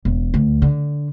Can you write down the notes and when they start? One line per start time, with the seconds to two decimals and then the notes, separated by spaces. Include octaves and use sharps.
0.05 E1
0.34 D2
0.62 D3